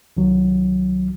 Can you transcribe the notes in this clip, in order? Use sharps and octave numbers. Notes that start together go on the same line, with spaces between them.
C2 D#3 F#3